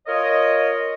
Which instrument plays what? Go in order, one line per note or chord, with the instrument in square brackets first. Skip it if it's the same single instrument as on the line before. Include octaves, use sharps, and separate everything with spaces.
[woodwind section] F4 A#4 C#5 D#5